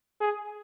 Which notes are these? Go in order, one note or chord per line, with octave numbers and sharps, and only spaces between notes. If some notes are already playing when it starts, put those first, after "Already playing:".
G#4